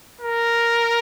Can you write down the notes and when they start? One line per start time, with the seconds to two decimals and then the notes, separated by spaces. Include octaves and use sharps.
0.21 A#4